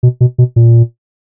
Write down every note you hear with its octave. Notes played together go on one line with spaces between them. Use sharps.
B2
B2
B2
A#2